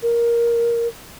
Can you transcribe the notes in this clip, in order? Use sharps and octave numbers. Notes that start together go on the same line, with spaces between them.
A#4